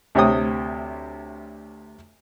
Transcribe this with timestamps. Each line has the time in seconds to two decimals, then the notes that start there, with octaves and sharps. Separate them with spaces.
0.15 D2 C3 C#5 G5 D#6